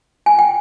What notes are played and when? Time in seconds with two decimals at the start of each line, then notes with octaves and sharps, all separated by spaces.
0.26 G#5
0.39 G5